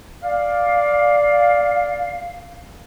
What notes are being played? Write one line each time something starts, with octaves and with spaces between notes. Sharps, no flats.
D5 F5